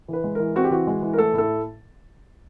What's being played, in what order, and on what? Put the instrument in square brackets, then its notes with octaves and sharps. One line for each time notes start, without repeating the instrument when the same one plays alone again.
[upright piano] E3 B4
G#3
E3 A#4
C4 F#4
G4
E3 F#4
G#3
E3
A#4
A3 A4
A2
A4